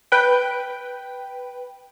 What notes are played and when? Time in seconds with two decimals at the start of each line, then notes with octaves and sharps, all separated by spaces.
0.12 B4 G5